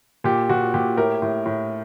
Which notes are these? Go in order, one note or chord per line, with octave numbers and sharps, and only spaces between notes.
A#2 G4
A#2 F#4
A#2 G4
A2 G4 A#4
A2
A2